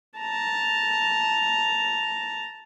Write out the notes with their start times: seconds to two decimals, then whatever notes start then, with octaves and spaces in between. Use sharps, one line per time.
0.18 A5 A#5